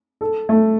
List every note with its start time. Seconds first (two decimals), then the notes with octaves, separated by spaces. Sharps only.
0.21 A4
0.49 A3